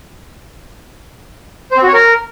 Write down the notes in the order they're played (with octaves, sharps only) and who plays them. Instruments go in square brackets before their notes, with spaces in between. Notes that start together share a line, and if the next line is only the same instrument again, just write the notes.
[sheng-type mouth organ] C5
C4
F#4
C#5
A#4